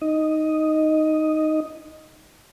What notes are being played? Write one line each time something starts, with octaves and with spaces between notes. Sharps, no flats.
D#4 D#5